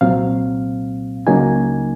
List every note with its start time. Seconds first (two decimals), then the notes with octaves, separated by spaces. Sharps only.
0.01 C2 A#2 F#3 C4 F5
1.27 C#2 C#3 F#3 A#3 D#4 G#5